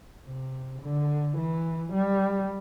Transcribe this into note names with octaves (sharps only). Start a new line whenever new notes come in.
C3
D3
E3
G3